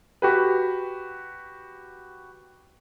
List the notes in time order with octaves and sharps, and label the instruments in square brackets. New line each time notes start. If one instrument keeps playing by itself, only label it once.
[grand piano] F#4 G4 B4